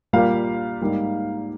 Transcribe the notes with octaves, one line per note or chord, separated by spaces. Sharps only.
A#2 G3 A#3 F5
G#2 G3 A#3